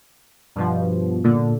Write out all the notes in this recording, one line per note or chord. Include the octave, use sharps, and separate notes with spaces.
G2 B2 F3
A#2 D3